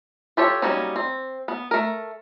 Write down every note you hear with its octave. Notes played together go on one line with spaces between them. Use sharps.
F4 G4 A4 C#5
F#3 G3 A#3 C#4 D#4
C4
B3
A3 A#4